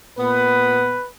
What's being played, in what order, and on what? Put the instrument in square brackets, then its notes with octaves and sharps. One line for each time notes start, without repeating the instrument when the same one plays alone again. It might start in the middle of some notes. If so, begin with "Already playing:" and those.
[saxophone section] A#2 B3 [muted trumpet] B4